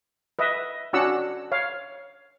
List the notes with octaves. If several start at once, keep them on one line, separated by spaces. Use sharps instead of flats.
B4 D#5 E5
C#4 D4 F#4 F#5 E6
C#5 F5